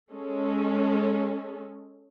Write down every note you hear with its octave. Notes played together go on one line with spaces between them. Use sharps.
G#3 C#4 A4